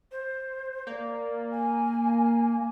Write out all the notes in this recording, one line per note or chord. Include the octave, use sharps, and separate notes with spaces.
C5
A#3 D5
G#5